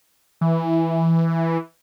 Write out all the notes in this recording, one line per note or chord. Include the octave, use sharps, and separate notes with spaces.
E3